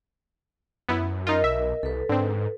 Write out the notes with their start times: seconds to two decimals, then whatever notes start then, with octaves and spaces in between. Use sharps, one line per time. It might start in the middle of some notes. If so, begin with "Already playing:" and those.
0.89 F#2 B3 E4
1.27 D#4 F4 A#4 D#5
1.44 B1 E5
1.83 C2 A4 B4
2.09 G#2 D3 C4